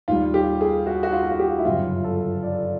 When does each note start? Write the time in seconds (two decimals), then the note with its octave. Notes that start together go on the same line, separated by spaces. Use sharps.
0.08 D#2 D#3 G3 F4
0.34 G4
0.61 G#4
0.86 F#4
1.03 F#4
1.12 F4
1.23 F4
1.31 F#4
1.39 G4
1.58 E4
1.65 G1 F#2 C#3 F4
2.04 A4
2.43 D5